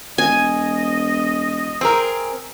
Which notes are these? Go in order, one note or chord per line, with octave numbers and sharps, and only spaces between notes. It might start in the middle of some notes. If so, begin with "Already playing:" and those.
E1 D#5 G#5
C4 G#4 A#4